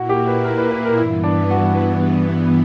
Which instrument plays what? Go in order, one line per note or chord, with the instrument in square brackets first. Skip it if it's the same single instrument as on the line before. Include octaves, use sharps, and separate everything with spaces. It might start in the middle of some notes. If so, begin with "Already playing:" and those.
Already playing: [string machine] A#2 A#3 E4 [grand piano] F#4
[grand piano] G4
B4
A#4
B4
B4
A#4
[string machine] G2 E3 B3 [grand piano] E4
[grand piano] D4
F#4